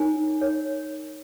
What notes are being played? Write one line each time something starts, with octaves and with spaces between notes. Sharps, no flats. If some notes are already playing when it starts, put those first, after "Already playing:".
Already playing: D#4 A#4 C#5 G#5
D#4 A#4 C#5